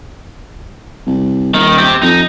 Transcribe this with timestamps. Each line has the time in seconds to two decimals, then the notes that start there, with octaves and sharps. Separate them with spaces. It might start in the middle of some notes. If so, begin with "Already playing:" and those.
1.06 C2
1.54 D#1 D#3
1.78 C4 G4
2.02 F2 D#4